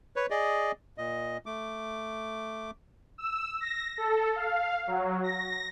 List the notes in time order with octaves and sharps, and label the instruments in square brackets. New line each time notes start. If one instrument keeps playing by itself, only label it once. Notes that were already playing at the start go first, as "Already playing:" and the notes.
[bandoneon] B4 C#5
G#4 D5 D#5
A#2 D#5
A3 D6
[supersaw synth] E6
A#6
A4
F5
F#3
A#6